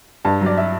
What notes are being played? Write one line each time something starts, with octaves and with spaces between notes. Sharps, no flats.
G2 A5
F#3 D5
E5